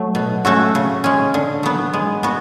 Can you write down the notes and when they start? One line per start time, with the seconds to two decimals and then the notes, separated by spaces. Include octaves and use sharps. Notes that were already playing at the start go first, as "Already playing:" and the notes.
Already playing: F#3 A3
0.15 B2
0.45 A3 C#4 F#4 A4
0.75 C#3
1.04 G#3 C#4
1.34 D3
1.63 F#3 B3
1.93 G#3
2.23 B3 F#4